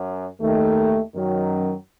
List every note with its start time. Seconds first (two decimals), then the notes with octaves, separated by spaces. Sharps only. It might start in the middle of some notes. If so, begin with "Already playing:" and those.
Already playing: F#2
0.40 D#2 D#3 A3
1.14 F#2 D#3 F#3